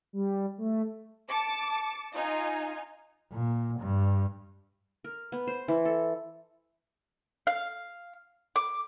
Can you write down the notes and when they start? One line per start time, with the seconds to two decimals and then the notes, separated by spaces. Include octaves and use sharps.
0.13 G3
0.58 A3
1.29 A5 D6 C#7
2.14 D#4 F4 G#5
3.33 A#2
3.79 G2
5.04 A#4
5.32 B3
5.47 C5
5.68 E3
5.85 A4
7.47 F5
8.56 D6